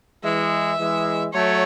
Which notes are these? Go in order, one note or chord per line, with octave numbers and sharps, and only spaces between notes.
E3 G#3 E5
E3 G#3
F#3 A3 C#5